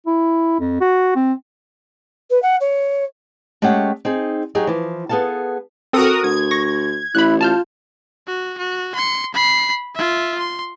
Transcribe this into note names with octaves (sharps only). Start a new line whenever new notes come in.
E4
F2
F#4
C4
B4
F#5
C#5
G#3 A3 C#4 G4 G#4 F#5
C4 D#4 G#4
F#3 D#4 G4 G#4 C#5
E3 F3
B3 G#4 A4 F5 A5
C4 F#4 A4 A#4 D#6
D2 G#6
C#6 A#6
A1 E4 B5 F#6
F4 A5 F6 G6
F#4
F#4
C6 C#7
B5 C7
F4 E5
C6